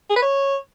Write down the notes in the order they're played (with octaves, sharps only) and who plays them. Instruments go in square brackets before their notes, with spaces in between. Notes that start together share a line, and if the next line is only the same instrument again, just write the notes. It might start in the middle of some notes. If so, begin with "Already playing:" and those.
[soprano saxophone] G#4
B4
C#5